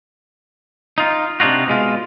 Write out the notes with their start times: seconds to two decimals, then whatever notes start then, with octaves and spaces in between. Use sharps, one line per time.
0.98 D#4 F4
1.40 C3 D4 D#4 F4 F#4
1.68 B2 G#3 F4